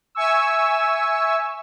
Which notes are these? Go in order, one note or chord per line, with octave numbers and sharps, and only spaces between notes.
E5 G#5 C#6 E6